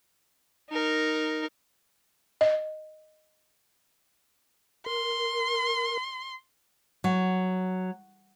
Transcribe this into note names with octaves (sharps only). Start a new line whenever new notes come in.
D#4 A#4
D#5
A#4 C6
F#3